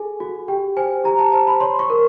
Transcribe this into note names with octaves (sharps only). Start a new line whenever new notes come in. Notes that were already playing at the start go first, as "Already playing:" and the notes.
Already playing: G#4 A4 G#5
F#4
G4 G5
C5 G#5
G4 A#5
A5
C5 A5
B5
C#5 C6
C#6
A#4